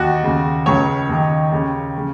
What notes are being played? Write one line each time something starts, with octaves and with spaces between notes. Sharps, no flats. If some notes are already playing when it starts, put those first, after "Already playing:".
Already playing: D#2 D#3 F#4
D#2 C#3
C#2 C#3 C#5
D#2 D#3
D#2 C#3
C#3